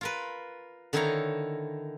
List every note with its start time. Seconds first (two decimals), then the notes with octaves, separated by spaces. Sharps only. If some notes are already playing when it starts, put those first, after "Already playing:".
0.01 F4 A#4 B4
0.93 D3 D#3 D#4 E4 C#5 A#5